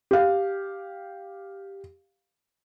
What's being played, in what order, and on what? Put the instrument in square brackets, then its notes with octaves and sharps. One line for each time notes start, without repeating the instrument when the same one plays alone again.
[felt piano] G4 F5